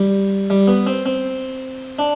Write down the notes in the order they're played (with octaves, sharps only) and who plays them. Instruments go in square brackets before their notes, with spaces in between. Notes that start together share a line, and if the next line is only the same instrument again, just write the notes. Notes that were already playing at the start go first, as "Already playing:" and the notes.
Already playing: [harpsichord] G3
G3
B3
C4
C4
D4